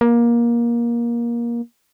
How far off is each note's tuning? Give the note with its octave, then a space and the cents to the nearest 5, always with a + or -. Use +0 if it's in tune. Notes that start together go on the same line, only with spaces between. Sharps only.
A#3 +20